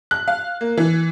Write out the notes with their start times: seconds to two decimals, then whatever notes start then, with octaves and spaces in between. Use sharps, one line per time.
0.11 F#6
0.28 F5
0.61 A#3
0.77 E3